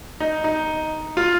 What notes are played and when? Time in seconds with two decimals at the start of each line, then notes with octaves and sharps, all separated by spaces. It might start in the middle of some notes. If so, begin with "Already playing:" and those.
0.20 D#4
0.44 D#4
1.17 F4